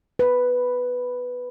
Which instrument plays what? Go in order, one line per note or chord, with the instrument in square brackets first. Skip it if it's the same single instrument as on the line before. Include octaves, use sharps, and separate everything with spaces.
[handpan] B4